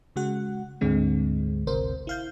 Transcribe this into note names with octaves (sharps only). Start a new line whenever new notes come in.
C#3 G#3 F#4 F#5
D2 G#2 D3 G#3 C4
G#1 D2 C3 A#4 C5
E4 F5 G6